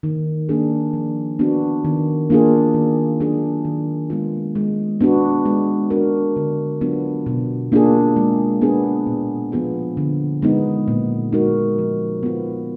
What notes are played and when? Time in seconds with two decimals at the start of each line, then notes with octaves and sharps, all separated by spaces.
0.03 D#3
0.49 A#3 D4 G#4
0.93 F3
1.39 B3 D4 F#4
1.85 D#3
2.30 A#3 D4 F4 G#4
2.74 D#3
3.20 F#3 D4 F4 G#4
3.65 D#3
4.10 G#3 B3 F4
4.55 G#3
5.01 B3 D4 F#4
5.45 G#3
5.90 D4 F#4 A#4
6.36 D3
6.81 F#3 B3 D4 F4
7.26 B2
7.72 A#3 D4 F4 G#4
8.16 G#3
8.62 B3 D4 G#4
9.07 A#2
9.52 F3 B3 F4 G#4
9.97 D3
10.42 G#3 B3 D#4
10.88 A#2
11.33 G#3 D#4 F#4 A#4
11.78 F3
12.23 B3 F4